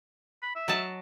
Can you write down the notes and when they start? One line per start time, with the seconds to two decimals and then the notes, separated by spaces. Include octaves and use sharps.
0.43 B5
0.56 E5
0.68 F#3 D#5 A5